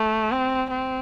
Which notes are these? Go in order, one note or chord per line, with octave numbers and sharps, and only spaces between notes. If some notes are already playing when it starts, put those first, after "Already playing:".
Already playing: A3
C4
C4